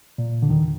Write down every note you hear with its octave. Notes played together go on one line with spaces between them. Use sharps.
A#2
D3
D#2 D#3